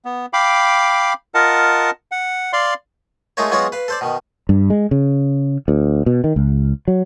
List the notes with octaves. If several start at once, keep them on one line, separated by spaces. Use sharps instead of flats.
B3
F5 G5 B5 D6
F4 A#4 D#5 F#5 A5
F#5
D5 F5 C6
G#3 A3 D#4 F4 A#4 C#5
F#3 G#3 B3 F4 F#4 C#5
B4 F5
A4 C5 D5
B2 D#3
G2
G#3
C#3
D2
B2
D#3
C#2
F#3